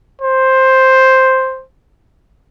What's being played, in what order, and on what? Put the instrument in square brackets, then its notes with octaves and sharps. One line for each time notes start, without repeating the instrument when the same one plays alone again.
[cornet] C5